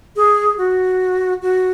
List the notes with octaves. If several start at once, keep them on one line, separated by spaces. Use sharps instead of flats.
G#4
F#4
F#4